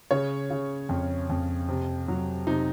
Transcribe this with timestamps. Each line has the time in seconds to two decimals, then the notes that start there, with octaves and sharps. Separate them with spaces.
0.11 C#3 C#5
0.50 C#3
0.89 F2
1.30 F2
1.69 C3
2.08 F#3
2.47 C3 D#4